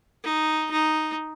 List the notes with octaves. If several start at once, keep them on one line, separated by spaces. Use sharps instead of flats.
D#4
D#4